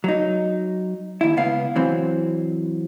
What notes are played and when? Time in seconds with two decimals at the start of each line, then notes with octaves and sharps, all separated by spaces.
0.04 F#3 D#4
1.21 D#2 E4
1.37 C#2 B3 F5
1.76 E3 F#3 C4